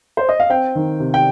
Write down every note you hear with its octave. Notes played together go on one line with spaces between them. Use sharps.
C5
D#5
F5
C4 G5
D#3
C3
G5